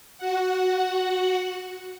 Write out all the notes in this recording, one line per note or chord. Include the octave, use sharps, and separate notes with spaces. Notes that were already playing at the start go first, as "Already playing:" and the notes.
F#4 F#5